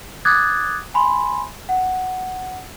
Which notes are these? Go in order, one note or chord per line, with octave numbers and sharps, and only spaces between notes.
D6 D#6 F#6 G#6 A6
G#5 B5 C6
F#5